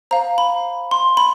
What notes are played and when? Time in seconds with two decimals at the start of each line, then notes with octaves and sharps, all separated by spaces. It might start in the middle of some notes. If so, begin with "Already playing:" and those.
0.11 C5 F5 A#5
0.38 B5
0.91 C6
1.17 B5